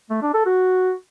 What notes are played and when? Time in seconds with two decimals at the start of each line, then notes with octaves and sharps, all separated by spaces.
0.10 A3
0.22 D4
0.34 A4
0.46 F#4